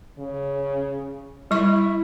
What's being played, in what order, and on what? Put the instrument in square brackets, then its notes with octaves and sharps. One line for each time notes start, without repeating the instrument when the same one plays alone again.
[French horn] C#3
[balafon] G3 C#6 [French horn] E4